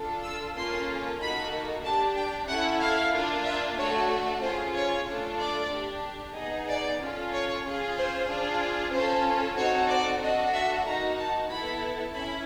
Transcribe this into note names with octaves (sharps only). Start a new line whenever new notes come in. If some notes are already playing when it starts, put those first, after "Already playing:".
Already playing: D4 F4 A4
E6
A#3 C#4 F4 A4 C6
A#3 D#4 F#4 A4 B5
D4 G4 A5
G5
C#4 E4 A4 F#5
F5
A#3 D4 F4
E5
A3 D4 F#4 A4 C#5
C#4 F4 G#4 C5
C#5
A3 D4 F4 A4
D5
D4 G4
B3 D#4 G#4 D#5
D5
C#4 F4 A4
C#5
C#4 F4 G#4
C5
D4 F4 G#4
C#4 F4 A4 C5
C4 D#4 F#4 A4 C#5
D5
D4 F#4 A4 D#5
E5
A#3 D#4 F#4 A#5
A5
B3 E4 A4 B5
C#4 E4 B5